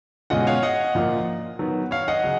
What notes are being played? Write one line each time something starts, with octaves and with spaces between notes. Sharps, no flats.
B2 G#3 C#4 F4 D#5 F#5
C#5 F5
D#5 F#5
A#2 F3 A#3 F4
D#3 F#3 B3
C#5 F5
D#5 F#5
C#3 F#3